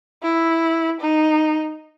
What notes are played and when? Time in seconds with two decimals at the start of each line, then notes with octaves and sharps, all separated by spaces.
0.23 E4
1.01 D#4